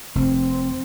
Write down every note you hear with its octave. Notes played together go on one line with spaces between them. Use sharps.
F1 C4